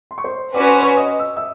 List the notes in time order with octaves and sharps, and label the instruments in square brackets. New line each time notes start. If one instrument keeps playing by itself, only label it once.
[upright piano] C6
C#6
C5 C6
[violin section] C#4 F#4 B4 [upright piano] D5 D6
[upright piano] C5 C6
C#5 C#6
D#5 D#6
E6
E5 E6